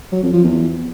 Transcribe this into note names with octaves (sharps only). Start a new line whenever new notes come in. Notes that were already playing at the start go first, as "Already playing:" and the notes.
F#3
F2
F3
E2